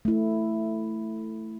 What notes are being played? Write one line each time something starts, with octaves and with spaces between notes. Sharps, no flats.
A3 E4